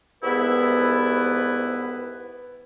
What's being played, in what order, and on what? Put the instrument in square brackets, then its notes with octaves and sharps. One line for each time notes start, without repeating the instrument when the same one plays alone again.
[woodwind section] C2 G#2 B3 E4 B4